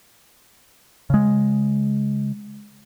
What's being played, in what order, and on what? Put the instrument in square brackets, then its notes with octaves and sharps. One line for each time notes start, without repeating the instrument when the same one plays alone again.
[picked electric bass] C#3 G#3